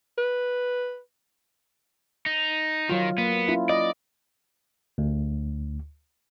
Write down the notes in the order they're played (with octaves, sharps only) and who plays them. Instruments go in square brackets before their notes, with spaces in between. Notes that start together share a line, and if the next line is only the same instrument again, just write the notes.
[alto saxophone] B4
[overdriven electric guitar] D#4
[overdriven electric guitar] D#3 [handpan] F#3 F4
[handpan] A#3 [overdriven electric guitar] B3
[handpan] C#4 E4 F4
[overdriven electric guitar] D5 [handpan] D#5
[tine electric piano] D2